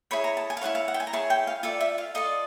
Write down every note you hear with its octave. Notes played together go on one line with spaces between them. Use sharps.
E4 G#4 C#5 B5
A#5
A5
G#5
F5
E4 G#4 C#5 F#5
F5
F#5
G5
G#5
A#5
E4 G#4 C#5 A5
G5
F5
F4 A4 D5 E5
E5
F5
F4 A4 D5 D#5